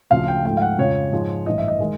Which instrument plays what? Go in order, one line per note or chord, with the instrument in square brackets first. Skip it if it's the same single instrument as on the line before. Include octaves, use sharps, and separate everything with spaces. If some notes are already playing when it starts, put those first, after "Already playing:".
[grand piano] D2 C#3 F3 F5
G5
G#2 F3 A3 G5
F5
F#5
F2 C#3 F3 G#3 C#5
G#2 F3 G#3
A1 G2 E3 D#5
E5
D#5
D#3 G#3